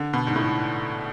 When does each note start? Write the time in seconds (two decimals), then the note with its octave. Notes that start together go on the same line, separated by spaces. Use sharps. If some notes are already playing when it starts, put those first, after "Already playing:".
Already playing: D3
0.13 B2
0.27 G#2
0.36 A2